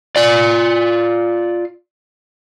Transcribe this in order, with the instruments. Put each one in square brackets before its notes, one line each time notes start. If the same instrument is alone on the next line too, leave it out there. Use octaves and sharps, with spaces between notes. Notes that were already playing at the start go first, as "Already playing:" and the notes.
[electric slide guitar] F4 D5